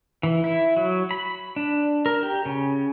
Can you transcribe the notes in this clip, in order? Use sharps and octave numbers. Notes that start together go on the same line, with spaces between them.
E3
E4
F#3
B5
D4
A#4
G4
C#3